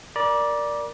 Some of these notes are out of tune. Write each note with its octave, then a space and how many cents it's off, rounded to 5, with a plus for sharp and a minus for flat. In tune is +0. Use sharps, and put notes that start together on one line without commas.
A#4 +0 D5 +0 A#5 +40